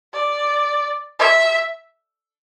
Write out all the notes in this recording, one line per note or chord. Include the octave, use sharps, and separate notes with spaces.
D5
E5